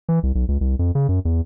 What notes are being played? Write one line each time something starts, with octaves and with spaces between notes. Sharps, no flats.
E3
C2
B1
C#2
C2
F2
C#3
F#2
E2